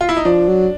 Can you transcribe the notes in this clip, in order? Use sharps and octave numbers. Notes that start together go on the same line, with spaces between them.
F4
E4
D#4
F3 D4
F#3